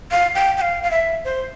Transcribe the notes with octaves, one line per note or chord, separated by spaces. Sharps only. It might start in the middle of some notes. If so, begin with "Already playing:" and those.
F5
G5
G5
F5
F5
E5
C5